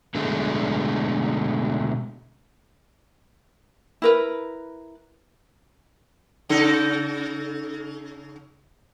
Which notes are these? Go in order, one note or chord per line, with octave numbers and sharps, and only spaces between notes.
B2 D3 G#3 A3
E4 A#4 B4
C#3 D#4 A4